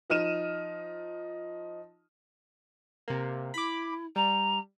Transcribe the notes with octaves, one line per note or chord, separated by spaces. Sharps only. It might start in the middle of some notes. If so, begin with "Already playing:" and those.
F3 D#4 F6 D#7 E7
C3 A#3
E4 B5 D6
G3 A#5